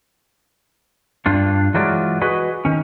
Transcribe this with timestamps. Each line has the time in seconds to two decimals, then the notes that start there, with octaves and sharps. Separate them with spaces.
1.26 G2 D4 F4
1.74 E3 F#3 G#3 F4 F#4 D5
2.22 F#4 G#4 B4 D#5
2.65 D#3 C#4